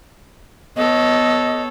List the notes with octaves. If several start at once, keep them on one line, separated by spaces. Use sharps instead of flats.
B3 A4 C#5 D#5